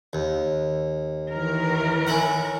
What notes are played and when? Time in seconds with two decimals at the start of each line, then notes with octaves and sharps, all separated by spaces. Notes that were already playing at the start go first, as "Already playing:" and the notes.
0.13 D#2
1.30 D#3 E3 A#4
2.07 C#4 E4 F#5